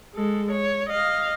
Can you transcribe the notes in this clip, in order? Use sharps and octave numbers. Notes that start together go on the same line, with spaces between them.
G#3 A4
C#5
D#5 F5